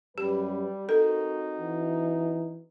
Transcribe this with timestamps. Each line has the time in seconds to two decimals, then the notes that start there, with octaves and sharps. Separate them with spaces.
0.18 F#2 G3 G4 B4
0.89 C4 D#4 F#4 A4 A#4
1.60 E3